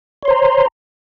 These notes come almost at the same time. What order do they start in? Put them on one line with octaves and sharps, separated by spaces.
C#5 C6 C5 A#5